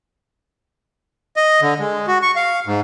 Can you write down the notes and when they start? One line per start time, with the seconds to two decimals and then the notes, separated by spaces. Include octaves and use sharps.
1.36 D#5
1.62 D3
1.80 G#3
2.07 F#4
2.22 C#6
2.36 F5
2.66 G#2